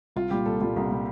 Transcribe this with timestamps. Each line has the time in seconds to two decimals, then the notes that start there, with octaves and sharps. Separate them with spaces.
0.16 C2 F4
0.30 A#2 G3 G4
0.46 C2 A4
0.61 A#2 G3 F4
0.76 C2
0.91 A#2 G3